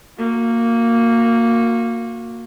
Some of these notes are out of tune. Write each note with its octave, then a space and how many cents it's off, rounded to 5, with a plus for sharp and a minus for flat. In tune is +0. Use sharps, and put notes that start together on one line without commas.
A#3 -10 F#4 -30